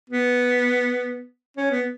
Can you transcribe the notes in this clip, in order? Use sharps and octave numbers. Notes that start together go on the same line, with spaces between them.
B3
C#4
B3